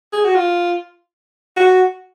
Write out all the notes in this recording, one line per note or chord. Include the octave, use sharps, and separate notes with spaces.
G#4
F#4
F4
F#4